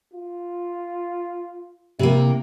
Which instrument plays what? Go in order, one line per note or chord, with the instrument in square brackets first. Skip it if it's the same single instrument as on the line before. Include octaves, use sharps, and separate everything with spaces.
[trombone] F4
[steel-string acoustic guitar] C3 A#3 [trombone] E4